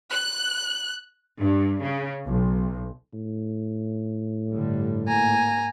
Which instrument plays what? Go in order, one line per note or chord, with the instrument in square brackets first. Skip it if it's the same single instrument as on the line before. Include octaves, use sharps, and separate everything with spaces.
[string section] F#6
G2
C#3
B1
[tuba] A2
[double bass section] G2 D3 G3
[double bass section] G#2 A#3 [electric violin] G#5 A#5